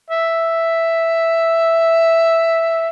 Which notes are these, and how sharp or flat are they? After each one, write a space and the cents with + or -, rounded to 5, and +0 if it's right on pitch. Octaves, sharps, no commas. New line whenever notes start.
E5 +0